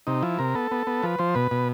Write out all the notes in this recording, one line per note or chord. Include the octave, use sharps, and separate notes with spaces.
C3 D#4
F3 E4
C3 A#4
B3 A4
B3
B3
F3 B4
F3 C5
B2 B4
B2